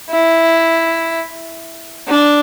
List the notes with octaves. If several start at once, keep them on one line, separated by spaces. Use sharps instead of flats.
E4
D4